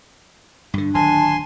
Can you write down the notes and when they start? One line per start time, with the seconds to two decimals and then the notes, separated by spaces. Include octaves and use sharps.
0.74 G2 D3 D4
0.95 D1 D#3 F#3 G#5 A5 C6